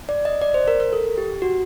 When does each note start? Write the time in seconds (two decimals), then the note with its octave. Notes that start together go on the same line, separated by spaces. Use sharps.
0.09 D5
0.25 D#5
0.42 D5
0.54 C5
0.68 A#4
0.80 A#4
0.93 A4
1.18 G4
1.42 F#4